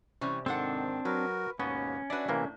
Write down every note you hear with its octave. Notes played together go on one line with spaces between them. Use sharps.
C3 E3 G3 C#4
G#2 D#3 C4 D4 A4 C5 F#5
F#3 F#4 A#4 B4
D#2 G#2 B2 A#3 B3 C#4
D4 F#4 B4 D5 E5
A2 C3 E3 A#3